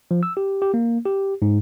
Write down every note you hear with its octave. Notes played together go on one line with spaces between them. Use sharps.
F3
E6
G4
G4
A#3
G4
G#2